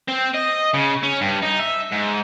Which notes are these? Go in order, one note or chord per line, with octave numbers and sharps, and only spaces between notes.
C4
D#5
C#3
C#4
G2
D#4
E5
G#2